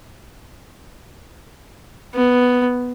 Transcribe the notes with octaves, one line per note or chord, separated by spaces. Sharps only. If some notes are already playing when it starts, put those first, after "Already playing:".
B3